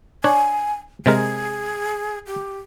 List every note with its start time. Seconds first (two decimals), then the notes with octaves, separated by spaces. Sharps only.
0.24 D4 C#5 G#5
1.06 C3 G#3 G#4 A#4
2.27 G4